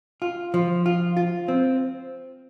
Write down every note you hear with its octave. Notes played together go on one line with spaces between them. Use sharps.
F4
F3
F4
F4
C4